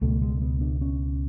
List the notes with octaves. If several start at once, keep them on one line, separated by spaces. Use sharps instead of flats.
C#2 B2 A3
G#3
B3
D4
C#4